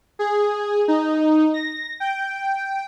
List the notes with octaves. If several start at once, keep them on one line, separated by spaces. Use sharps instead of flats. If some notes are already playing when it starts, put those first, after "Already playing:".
G#4
D#4
A#6
G5